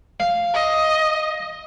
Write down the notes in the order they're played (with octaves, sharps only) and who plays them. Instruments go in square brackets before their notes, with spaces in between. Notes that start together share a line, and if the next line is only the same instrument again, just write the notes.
[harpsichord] F5
[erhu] D#5